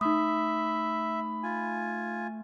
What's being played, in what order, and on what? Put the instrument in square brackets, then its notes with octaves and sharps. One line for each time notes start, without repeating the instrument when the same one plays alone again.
[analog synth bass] A3 [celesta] D#4 D#6 [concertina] E5 [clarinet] B5
[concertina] F4 G#5